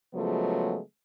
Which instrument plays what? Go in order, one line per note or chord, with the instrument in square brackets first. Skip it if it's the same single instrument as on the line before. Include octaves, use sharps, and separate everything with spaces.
[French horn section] C#3 F3 F#3 G#3 A3 B3